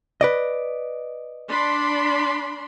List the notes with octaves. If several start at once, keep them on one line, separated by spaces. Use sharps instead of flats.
B4 D5 D#5
D4 B5 C6